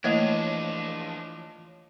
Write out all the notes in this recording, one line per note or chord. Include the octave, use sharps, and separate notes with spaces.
E3 F3 A3 A#3 D4 C#5 D#5